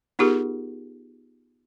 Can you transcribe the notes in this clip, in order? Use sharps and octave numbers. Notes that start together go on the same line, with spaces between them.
B3 D#4 F4 G4 G#4 A#4